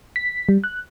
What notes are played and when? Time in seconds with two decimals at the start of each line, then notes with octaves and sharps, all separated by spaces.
0.16 B6
0.49 G3
0.64 F#6